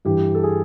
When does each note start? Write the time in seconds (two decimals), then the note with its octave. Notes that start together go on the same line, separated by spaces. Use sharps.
0.05 G2 E3 G4
0.35 A4
0.44 G#4